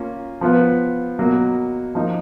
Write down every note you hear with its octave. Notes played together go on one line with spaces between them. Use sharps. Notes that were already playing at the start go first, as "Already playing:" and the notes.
Already playing: A#3 C#4 F4
F3 B3 F4 B4
B2 F#3 A#3
F3 A#3 D#4